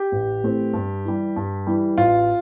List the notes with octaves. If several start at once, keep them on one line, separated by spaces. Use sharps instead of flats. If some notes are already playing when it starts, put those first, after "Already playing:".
Already playing: G4
A1
A2 E3 A3 C4
G2
E3 G3
G2
E3 G3
A1 F4